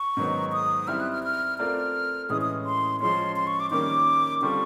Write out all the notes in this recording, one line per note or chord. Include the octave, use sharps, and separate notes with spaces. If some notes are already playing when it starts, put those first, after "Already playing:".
Already playing: C#6
G#2 D#3 F#3 B3 D#4
D#6
G3 C4 E4 F6
F#6
F6
F6
A3 C4 F4 A#4 D5 F6
A2 E3 G#3 C#4 D#6
D#6
C6
F3 G#3 C#4 C6
C6
C#6
D6
D#3 G3 A#3 C#4 D6
D3 G3 C4 F4 A4 C#6